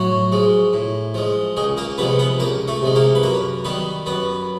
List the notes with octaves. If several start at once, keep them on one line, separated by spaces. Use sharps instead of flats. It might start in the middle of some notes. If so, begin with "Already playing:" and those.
Already playing: A2 F#3 F#4
F3 G#3
A2
F3 G#3
C#2 G#3 G#4
A#3 A#4
C3 F3 G#3 B3 B4
B3 B4
C#2 A#3 A#4
A3 A4
C3 F3 G#3
A#3 A#4
B4
F#2 A#3 A#4
D#3 G3 B3 B4
F#2 B3 B4